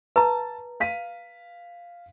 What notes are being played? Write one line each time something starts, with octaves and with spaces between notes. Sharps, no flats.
B4 A5 A#5
F5 B6 D#7